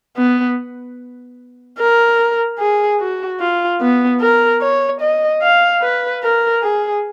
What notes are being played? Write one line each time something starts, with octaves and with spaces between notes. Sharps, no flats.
B3
A#4
G#4
F#4
F4
B3
A#4
C#5
D#5
F5
B4
A#4
G#4